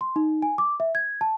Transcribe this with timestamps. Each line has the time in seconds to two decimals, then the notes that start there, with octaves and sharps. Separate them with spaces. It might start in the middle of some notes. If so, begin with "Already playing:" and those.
0.01 C6
0.16 D#4
0.42 G#5
0.58 D6
0.80 E5
0.95 G#6
1.21 A5